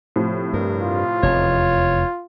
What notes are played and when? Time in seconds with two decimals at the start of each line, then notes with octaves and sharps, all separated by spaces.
0.16 A2 C3 F3
0.53 G2 A#4
0.83 F4
1.23 F1 E2 C#5